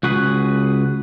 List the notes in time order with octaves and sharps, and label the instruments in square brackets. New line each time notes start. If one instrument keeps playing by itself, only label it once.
[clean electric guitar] C#2 F#4 G#4 B4